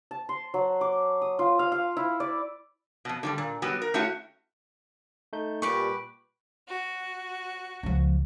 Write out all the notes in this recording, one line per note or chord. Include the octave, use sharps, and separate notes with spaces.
A5
C6
F#3
D6
D#6
F4
F5
F5
E4
D5
F2 B2
D3 F3 G3
A#2
F#3 G3 B3 F#4
A#4
A3 C#4 E4 F#4 G4
A3 D#4 G6
A#2 G3 G4 B4 C#6
F#4
C#2 F3